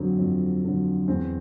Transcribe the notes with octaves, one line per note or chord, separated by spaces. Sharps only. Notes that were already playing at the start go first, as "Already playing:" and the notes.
Already playing: F2 D3 F#3 C4
F2
D3 F#3
E2 C4